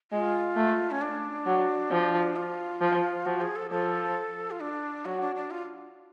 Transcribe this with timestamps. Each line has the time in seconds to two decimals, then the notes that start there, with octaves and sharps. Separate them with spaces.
0.11 G#3 F4
0.56 A3
0.91 C#4
1.01 D4
1.46 F#3
1.91 F3
2.36 F4
2.81 F3
3.26 F3 F#4
3.41 G#4
3.56 A4
3.71 F3 A4
4.51 F4
4.61 D4
5.05 F#3 F#4
5.21 D4
5.36 D4
5.51 F4